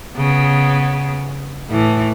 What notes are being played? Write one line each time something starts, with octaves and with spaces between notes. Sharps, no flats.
C#3 B3
A2 E3